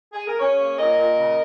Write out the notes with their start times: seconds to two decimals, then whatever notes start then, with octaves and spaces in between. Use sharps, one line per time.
0.13 G#4
0.27 A#4
0.40 C#4 G#4 C#5
0.60 A#3
0.78 A#2 A#4 D#5
0.98 A#2
1.18 C#3